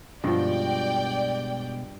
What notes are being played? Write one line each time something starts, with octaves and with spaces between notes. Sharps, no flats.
G2 B2 F3 G#3 F#4 D5 G5